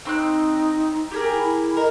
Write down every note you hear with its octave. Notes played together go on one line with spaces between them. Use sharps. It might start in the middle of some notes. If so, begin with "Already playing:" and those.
C4 D#4 C6 F#6
G4 G#4 A#4
E4
A#4 D#5